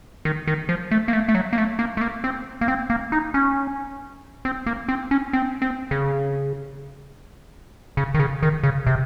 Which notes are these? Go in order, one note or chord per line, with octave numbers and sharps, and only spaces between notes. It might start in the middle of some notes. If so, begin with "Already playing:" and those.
D#3
D#3
F3
A3
A#3
A3
A3
F#3
A#3
A3
A#3
A3
A#3
C4
A#3
C4
A#3
D#4
C#4
C4
A#3
C4
C#4
C4
C4
C#3
C#3
D#3
C#3
D#3
C#3
C3